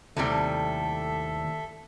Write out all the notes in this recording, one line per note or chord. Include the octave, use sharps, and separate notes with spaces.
D#2 A2 C3 G3 A4 E5